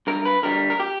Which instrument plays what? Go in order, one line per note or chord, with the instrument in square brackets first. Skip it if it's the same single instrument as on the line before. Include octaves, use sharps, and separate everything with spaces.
[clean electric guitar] G2 A#4
B4
D3 G3 A#4
A#4
G4